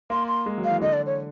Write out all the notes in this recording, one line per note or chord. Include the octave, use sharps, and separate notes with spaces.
A#3 C6
C6
G#3
F#3
F5
E3
D3 D#5
D5
C#5